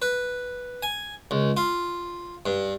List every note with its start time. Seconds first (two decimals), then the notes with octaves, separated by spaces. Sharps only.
0.02 B4
0.83 G#5
1.31 C#2
1.57 F4
2.46 G2